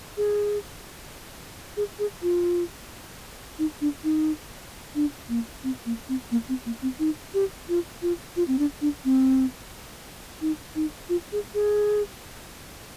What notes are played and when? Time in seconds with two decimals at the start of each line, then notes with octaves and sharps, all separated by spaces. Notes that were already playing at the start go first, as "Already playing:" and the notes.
0.17 G#4
1.77 G#4
1.99 G#4
2.22 F4
3.59 D#4
3.81 D4
4.04 D#4
4.95 D4
5.29 A#3
5.64 C4
5.86 A#3
6.09 C4
6.31 A#3
6.49 C4
6.66 A#3
6.82 C4
6.99 D#4
7.34 G4
7.69 F4
8.02 F4
8.36 F4
8.48 C4
8.59 D4
8.81 D4
9.05 C4
10.41 D#4
10.75 D#4
11.09 F4
11.32 G#4
11.54 G#4